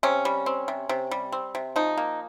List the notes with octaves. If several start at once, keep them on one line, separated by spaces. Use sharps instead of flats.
C3 C#4
G3
C4
C3
C3
G3
C4
C3
F3 D#4
A#3